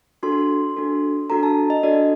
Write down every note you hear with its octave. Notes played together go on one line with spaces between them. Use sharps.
D4 F#4 A4 C6
D4 F#4 A4
D4 F#4 A4 A#5
A5
D#5
D4 F#4 A4 D5